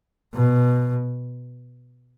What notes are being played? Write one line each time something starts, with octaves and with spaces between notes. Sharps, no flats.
B2